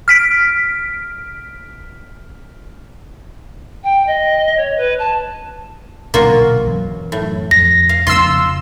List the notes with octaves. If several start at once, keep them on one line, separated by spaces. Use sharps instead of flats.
F6 B6 D7
G5
D#5
C#5
B4
A5
B1 A#2 D3 A#3 F4 F#4
F#2 E3 F#3
A2
F2 A#6
F5
F2 C#3 B3 F4 C6 E6